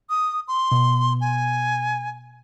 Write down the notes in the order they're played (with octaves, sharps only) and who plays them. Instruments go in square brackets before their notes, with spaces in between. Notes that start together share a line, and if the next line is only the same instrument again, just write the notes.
[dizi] D#6
C6
[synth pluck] B2
[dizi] G#5